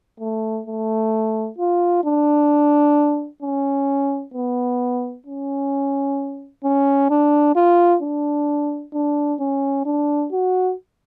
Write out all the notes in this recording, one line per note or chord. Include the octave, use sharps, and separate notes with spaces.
A3
A3
F4
D4
C#4
B3
C#4
C#4
D4
F4
D4
D4
C#4
D4
F#4